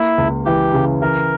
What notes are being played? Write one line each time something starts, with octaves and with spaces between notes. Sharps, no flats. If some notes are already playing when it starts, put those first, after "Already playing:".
Already playing: A#3 E4
C#2
E3 G4
C#3
E3 A#4